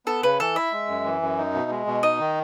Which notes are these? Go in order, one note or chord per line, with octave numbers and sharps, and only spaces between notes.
B3 A4
C#3 B4
E3 A4
E4 E5
G#3
F#2
E3
F#2
D#4
B2
G#3
B2
D#4 D#5
D#3